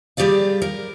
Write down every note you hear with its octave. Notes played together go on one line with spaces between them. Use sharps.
G3 G4 G#4 D5 F5
A#4